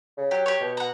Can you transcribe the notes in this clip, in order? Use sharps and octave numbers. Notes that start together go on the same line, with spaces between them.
C#3
F#3 G4
G4 C#5
B2
F#5 A#5